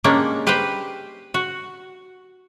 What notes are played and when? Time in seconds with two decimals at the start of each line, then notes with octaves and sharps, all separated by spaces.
0.04 G#3 A#3 C#4 D4 G4
0.47 G4 B4 C5 F5 G5
1.34 F#4